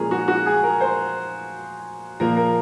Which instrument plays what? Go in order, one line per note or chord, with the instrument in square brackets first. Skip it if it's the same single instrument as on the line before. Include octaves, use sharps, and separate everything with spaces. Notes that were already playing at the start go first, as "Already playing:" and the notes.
Already playing: [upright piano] A#2 F3 G#3 C#4 G#4 A#4
F#4
F#4
G#4
A#4
C5
A#2 F3 A#3 A#4
A#4